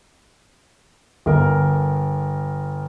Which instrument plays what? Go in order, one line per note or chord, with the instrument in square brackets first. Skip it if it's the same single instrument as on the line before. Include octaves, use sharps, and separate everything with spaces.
[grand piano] G1 A#4